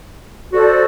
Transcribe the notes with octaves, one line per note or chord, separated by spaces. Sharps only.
F#4 A4 C5 D5